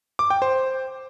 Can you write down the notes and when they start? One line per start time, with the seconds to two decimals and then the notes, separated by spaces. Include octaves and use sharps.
0.19 D6
0.30 G5
0.42 C5